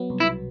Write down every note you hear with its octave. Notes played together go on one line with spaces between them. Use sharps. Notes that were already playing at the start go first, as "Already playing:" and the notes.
Already playing: F#3 B3
C2
E4
B2